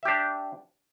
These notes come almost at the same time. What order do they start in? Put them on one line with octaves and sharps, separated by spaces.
E5 G4 D4